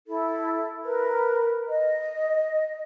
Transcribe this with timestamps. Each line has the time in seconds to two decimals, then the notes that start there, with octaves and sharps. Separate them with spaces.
0.07 E4 A4
0.83 A#4 B4
1.70 D#5